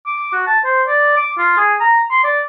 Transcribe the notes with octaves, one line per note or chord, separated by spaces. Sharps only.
D6
F#4
A5
C5
D5
D6
F4
G#4
A#5
C6
D5